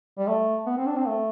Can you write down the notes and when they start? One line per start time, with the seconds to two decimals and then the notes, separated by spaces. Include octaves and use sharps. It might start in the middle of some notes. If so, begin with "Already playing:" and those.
0.18 G3
0.28 A3
0.67 B3
0.78 C4
0.87 D4
0.96 C4
1.07 A3